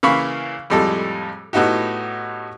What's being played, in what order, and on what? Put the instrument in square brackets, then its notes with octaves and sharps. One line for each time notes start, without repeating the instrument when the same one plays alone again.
[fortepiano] C#3 E3 A#3 F5 B5 C#6
F2 A2 G3 G#3 A4
A2 B3 D#4 F#4 G4